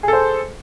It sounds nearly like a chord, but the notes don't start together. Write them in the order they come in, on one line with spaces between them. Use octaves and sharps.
G#4 A4 C5